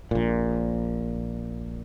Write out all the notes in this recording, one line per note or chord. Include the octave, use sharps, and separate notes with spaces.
A#1 A#2